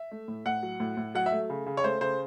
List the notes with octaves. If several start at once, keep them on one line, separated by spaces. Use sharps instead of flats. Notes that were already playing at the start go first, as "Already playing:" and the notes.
Already playing: E5
A3
A2
A2 F#5
F#3
A2
A2
F#3 F#5
E5
A3
C#3
C#3
C#5
A3 C5
C#3 C5